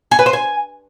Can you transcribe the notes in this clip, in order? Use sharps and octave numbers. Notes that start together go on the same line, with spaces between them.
G#5
B4
C5
G#5